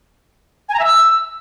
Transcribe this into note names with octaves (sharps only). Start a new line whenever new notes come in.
G#5
A#5
E5
E6